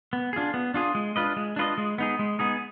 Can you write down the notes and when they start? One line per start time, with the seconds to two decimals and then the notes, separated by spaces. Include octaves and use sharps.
0.13 B3
0.33 D4 F4 G#4
0.54 B3
0.74 D4 F4 G#4
0.95 G#3
1.16 D4 F4 B4 D#5
1.36 G#3
1.56 D4 F4 B4 D#5
1.78 G#3
1.98 B3 D#4 G#4
2.19 G#3
2.39 B3 D#4 G#4